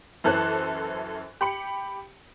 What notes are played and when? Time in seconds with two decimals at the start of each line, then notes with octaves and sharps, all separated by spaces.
0.24 F#2 E3 A4 C5 F#6
1.41 G4 B5 C#7